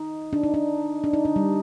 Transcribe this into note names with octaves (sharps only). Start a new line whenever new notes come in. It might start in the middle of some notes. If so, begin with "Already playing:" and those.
Already playing: D#4
D4
D#4
D4
D4
D#4
D4
G3